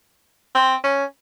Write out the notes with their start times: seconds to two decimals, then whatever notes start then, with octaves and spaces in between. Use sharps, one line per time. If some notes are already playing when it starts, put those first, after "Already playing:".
0.55 C4
0.84 C#4